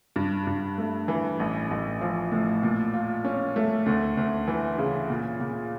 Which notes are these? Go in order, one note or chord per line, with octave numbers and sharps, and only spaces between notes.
G2
G2
A3
E3
A1
A1
F3
A2
A#2
F4
C#4
A3
D2
D2
E3
C#3
A#2
A#2